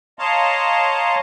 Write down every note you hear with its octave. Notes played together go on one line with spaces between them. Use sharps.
C#5 D#5 F5 A5 A#5 C6